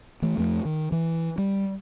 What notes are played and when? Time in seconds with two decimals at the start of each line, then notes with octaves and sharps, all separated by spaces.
0.22 E3 A3
0.37 F2 F3 A3
0.65 D#3
0.92 E3
1.38 G3